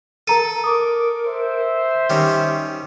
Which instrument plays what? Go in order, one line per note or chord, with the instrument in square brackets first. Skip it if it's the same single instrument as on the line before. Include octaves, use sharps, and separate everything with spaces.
[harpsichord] A4 [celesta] A#4 A#5 D#7
[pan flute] A#4 [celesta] D6 D#6
[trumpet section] C5 E5
[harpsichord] D#3 G3 C#4 [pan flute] G4